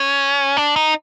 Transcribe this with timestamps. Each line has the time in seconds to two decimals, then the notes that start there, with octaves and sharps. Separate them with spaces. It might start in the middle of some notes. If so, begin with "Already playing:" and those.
Already playing: C#4
0.57 D4
0.76 D#4